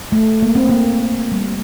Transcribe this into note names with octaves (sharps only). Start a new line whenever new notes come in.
A3
A#3
C4
A#3
G3